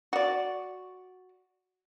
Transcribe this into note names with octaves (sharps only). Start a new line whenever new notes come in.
F#4 D5